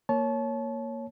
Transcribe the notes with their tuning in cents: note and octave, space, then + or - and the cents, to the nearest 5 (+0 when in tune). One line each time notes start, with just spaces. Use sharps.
A#3 +0 C#5 +0 A5 -30